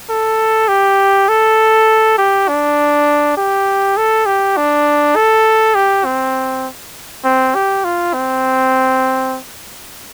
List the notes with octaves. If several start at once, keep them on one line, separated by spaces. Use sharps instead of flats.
A4
G4
A4
G4
D4
G4
A4
G4
D4
A4
G4
C4
C4
G4
F4
C4